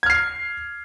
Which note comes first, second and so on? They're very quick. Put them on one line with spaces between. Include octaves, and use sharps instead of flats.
G#6 F6 C7